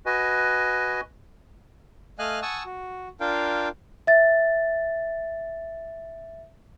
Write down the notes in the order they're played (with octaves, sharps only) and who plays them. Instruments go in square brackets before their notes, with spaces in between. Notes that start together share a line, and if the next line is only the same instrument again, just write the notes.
[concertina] F#4 B4 D#5 G#5
[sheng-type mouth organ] A3 D#5 F5 G#5 F6 F#6
F#5 G#5 A5 C#6 D#6 E6
F#4
D4 F4 A#4 F5 G5
[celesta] E5 A6